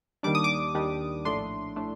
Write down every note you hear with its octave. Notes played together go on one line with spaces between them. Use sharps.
D#2 D#3 G3 D4 D6
D#6
D6
D#2 D#3 G3 D4
A#1 A2 A3 D4 C6
A2 A3 D4